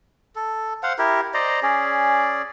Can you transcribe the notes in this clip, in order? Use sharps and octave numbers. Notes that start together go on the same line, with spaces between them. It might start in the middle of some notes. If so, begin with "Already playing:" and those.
A4
C5 F5 F#5
E4 G4 A#4
C5 D5 D#5 A#5
C#4 G#4 D5